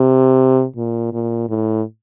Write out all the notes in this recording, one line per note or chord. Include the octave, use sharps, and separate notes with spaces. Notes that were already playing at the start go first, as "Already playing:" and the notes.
Already playing: C3
A#2
A#2
A2